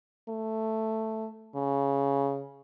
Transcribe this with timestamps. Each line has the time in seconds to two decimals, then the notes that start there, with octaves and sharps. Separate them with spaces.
0.29 A3
1.55 C#3